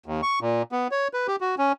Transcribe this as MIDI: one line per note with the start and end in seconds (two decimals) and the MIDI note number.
0.06 0.21 39
0.22 0.39 85
0.41 0.62 46
0.72 0.88 59
0.91 1.08 73
1.13 1.27 71
1.28 1.36 67
1.41 1.55 66
1.58 1.72 61